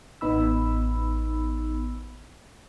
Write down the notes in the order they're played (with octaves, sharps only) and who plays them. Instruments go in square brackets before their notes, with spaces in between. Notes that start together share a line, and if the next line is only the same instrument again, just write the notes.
[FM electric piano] A1 B3 D#4 B5 E6